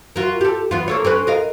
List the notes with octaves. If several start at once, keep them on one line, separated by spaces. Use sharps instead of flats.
F4 F#4 A#4
G4 A4
E2 B3 F4
A#3 A4 C#5
C4 C#4 B4
A#4 D#5 F5